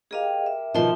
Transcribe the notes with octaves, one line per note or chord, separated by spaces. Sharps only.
G4 G#4 A#4 D#5 F5 G5
E5
B2 D#3 F3 E5 C6